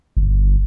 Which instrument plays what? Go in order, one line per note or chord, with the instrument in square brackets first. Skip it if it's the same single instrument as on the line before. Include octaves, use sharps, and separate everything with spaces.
[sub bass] G1